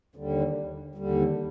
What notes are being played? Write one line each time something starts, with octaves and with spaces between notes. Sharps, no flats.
D#2 D3 G3
D#2 D3 G3